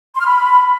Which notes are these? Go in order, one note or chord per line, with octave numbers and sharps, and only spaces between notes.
C6
F6
B5